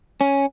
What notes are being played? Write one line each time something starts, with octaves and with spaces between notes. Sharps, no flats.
C#4